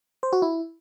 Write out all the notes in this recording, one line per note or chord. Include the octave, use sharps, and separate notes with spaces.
C5
F#4
E4